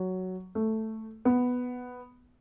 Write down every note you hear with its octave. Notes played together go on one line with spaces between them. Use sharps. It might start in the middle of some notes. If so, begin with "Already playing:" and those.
Already playing: F#3
A3
B3